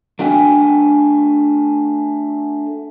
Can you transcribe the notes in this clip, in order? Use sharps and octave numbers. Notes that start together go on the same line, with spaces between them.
A3 D4 F#4 G5 G#5